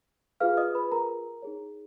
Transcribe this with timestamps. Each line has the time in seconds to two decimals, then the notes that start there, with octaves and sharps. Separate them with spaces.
0.40 F4 G#4 B4 F5 F6
0.57 D#5 D#6
0.75 B4 B5
0.92 A#4 A#5
1.42 D#4 G#4 C#5